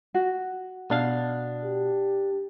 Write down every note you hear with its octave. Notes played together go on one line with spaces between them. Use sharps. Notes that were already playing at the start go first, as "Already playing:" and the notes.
F#4
B2 D4 F5
G4